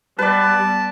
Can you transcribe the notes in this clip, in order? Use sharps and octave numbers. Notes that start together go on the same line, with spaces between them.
G3 B3 B4 D5 A5